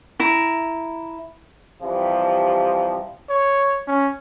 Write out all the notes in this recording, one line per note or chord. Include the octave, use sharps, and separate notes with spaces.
E4 A#5
C3 E3 F3 G3
C#5
C#4